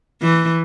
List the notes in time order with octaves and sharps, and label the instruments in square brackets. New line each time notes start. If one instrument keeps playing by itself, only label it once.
[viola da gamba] E3